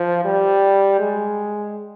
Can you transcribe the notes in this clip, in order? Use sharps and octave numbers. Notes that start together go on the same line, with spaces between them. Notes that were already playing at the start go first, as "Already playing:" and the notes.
Already playing: F3
G3
G#3